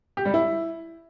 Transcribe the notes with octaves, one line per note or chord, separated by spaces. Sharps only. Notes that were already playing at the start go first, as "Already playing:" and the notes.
G4
G3
E4